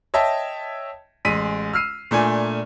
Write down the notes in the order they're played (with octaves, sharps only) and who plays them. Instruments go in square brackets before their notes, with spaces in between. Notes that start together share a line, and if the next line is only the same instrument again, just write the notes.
[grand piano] C#5 D#5 E5 G5 A5
A1 G#3 B6 D#7
E6 F6 C7 D#7
A#2 A3 D4 G#5